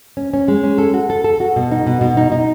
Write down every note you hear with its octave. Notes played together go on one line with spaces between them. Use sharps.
C#4
C#4
G#3
C#4
A4
F#4
A4
A4
F#4
B2
D#4
B2
B2
D#4
D#4